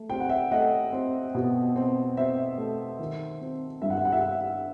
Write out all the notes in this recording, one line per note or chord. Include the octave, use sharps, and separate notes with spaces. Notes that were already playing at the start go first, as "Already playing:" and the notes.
Already playing: A3
C4 G5
F#5
E5 G5
A3 D#5 F#5
C4
B2
C4
C4 C5 E5
A3
D#3
C4
G2 E5
F#5
E5
F#5
E5
F#5